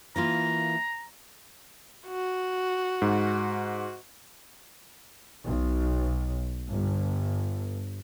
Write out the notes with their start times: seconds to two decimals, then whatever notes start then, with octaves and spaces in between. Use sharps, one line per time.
0.16 E3 A#3 F4 A#5
2.08 F#4
3.02 G#2
5.45 B1
6.68 G1